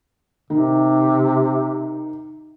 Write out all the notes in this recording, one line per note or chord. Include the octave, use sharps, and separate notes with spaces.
C3 D#3